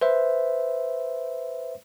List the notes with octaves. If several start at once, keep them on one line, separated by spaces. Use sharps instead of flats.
B4 C5 E5